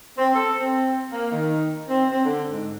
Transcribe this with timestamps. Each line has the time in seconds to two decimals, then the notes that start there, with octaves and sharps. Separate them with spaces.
0.18 C4
0.35 A4
0.60 C4
1.11 A#3
1.32 D#3
1.88 C4
2.10 C4
2.25 D3
2.51 G#2